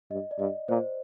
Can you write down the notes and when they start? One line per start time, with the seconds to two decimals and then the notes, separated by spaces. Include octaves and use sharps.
0.10 G2 D#5
0.31 D5
0.39 G2 D#5
0.69 A#2 C5